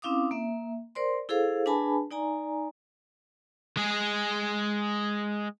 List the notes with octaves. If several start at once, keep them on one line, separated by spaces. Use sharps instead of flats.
C4 C#4 E4 F5 D6 D#6
A#3 E5
A#4 C5 D5 C6
E4 G#4 A4 C5 F5
D4 G#4 B4 G#5 A5 B5
D#4 D5 G#5 A#5
G#3 G#4